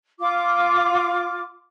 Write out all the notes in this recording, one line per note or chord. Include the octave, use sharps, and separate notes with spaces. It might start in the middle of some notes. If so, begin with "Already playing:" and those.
F4 D6